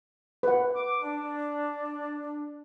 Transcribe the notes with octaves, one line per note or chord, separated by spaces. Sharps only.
B4 F#5
D6
D4